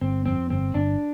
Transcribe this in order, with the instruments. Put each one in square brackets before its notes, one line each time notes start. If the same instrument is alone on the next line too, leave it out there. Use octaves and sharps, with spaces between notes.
[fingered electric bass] G1 [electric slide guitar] C4
[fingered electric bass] F2 [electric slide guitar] C4
[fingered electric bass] G1 [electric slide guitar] C4
[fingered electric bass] G1 [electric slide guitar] D4